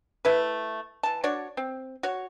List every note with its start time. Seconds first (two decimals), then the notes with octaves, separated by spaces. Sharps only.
0.25 A3 E4 B4
1.03 E3 A5
1.23 D4 F#4 C#5 D5
1.57 C4
2.03 F#4 C#5